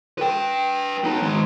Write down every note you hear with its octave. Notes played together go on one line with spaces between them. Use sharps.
B4 G5
B3 D#4
D#3 G#3